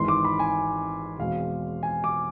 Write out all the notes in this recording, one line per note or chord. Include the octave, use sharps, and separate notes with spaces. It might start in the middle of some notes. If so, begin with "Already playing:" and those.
Already playing: G#1 G#2 E3 C6
D6
B5
G#5
E2 B2 G#3 C4 F5
G#5
D6